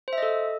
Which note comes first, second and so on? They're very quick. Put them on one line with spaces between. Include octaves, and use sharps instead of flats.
C5 E5 D#5 A4